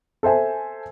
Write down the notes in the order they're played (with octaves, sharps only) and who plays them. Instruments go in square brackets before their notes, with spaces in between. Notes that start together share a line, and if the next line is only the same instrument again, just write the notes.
[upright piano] A4 C5 E5 G#5